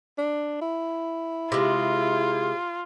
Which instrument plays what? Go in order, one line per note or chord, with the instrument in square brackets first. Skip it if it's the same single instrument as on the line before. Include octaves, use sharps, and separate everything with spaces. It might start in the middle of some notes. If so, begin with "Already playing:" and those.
[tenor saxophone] D4
E4
[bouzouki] C3 G#3 [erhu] F4